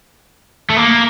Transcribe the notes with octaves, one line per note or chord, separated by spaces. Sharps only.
A3
A#3